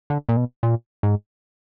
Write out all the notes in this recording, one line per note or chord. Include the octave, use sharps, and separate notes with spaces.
D3
A#2
B2
A#2
G#2